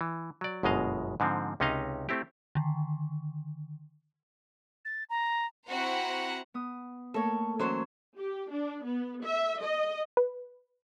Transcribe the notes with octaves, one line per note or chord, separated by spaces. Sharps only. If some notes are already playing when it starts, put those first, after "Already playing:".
E3
F#3 D5
G1 F#2 B2 G#3 D#5 F5
G#2 D3 F3 C4
C#2 C3 C#4 D#4 D#5 F5
A3 C4 E4 G4
D3 D#3
A6
A#5
C4 E4 F#4 C5 F#5 A#5
B3 D#6
A3 A#3 A4 A#4 C#5
E3 F#3 C#4 C5 C#5
G4
D4
B3
E5
D#5
B4